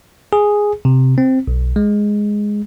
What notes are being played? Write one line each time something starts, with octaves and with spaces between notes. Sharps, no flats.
G#4
C3
C4
B1
G#3